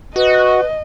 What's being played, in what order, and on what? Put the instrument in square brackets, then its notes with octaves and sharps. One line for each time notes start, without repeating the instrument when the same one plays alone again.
[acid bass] F#4 [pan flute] B4 [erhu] D#5